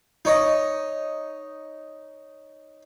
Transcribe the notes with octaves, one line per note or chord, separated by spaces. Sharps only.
D#4 C#5 D#5